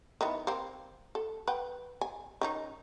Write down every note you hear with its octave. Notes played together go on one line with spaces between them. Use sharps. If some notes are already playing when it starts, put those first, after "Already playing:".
D#3 E3 B3
A#3 C4
A4
B4 F#5 G5
G#5
D#3 C#4 D#4